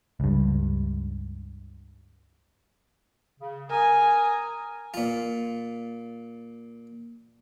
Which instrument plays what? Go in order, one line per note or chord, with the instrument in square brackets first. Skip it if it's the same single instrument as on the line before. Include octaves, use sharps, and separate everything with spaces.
[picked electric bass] C#2 G2
[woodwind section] C#3
[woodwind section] A#4 A#5 D#6 [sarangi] G#5
[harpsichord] A#2 F4